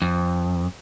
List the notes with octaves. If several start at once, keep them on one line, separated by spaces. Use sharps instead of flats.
F2